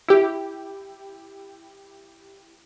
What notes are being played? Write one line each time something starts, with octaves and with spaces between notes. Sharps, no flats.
E4 G4